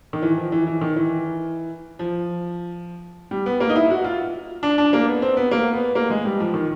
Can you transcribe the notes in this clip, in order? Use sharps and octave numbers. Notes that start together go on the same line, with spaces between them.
D#3
E3
F3
E3
E3
D#3
E3
F3
G3
B3
A#3
D#4
E4
F#4
F4
D4
D4
A#3
B3
C4
B3
A#3
B3
A#3
G#3
G3
F3
D#3